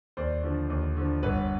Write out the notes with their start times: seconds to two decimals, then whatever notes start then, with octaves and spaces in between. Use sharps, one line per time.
0.17 D#2 C5 D5
0.43 D3 F3
0.70 D#2
0.97 D3 F3
1.23 G1 B4 C#5